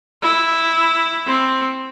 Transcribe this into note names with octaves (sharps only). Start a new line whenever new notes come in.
E4
C4